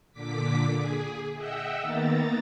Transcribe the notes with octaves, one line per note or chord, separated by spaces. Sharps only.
A#2 D3 D6 B6
G#4
D#5 E5 F#5 G5 E6
D#3 A#3 B3 A#5 A6